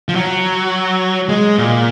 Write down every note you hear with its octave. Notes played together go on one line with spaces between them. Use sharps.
F3
F#3
G#3
A#2